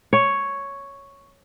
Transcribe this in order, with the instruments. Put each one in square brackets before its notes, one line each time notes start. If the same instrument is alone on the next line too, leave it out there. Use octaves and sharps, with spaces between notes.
[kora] C#5